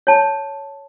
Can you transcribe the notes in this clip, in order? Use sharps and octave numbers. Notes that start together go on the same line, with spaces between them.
C#5 A5